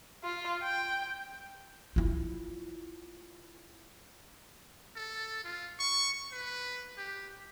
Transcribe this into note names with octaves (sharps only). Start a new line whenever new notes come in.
F4
G5
E4 F4
A4
F4
C#6
B4
G4